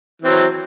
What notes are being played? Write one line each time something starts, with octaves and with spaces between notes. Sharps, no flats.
E3 F#3 C4